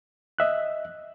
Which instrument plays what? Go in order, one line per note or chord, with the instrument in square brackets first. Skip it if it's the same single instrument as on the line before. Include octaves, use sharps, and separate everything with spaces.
[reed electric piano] D#5 E5 F#6